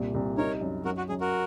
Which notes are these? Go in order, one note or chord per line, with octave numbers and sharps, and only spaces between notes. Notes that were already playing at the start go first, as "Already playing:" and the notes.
Already playing: C2 A#2
C2
D#4 A#4 C#5
F#2
F#2 F#4 A#4
F#4
F#2 G#4
F#4 A#4